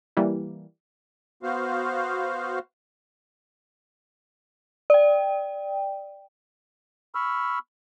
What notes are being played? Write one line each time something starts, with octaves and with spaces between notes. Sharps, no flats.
E3 G3 A#3
B3 F#4 C5 F5
D5 G5
B5 C#6 E6 F6